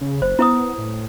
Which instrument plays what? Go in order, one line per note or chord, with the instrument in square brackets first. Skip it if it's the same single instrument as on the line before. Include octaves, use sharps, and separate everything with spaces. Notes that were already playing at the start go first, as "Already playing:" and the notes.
[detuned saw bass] C#3
[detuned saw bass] F#1 [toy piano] C5
[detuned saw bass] B3 [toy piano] E4 B4 D#6
[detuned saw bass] A2